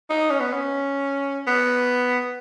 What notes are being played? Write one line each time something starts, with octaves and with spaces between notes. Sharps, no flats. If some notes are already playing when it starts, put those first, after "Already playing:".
D#4
C#4
B3
C#4
B3